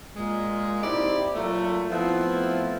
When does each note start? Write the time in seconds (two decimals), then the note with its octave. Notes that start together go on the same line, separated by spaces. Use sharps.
0.16 A#2 G#3
0.83 C4 D#4 E4 G4 D5
1.35 A#2 F#3 A3
1.90 F3 A3 B3 C4 E4